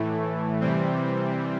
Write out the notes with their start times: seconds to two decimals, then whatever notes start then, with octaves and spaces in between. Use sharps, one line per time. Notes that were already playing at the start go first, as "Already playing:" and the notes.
Already playing: A2 E3 A3
0.61 C3 E3 G3 C4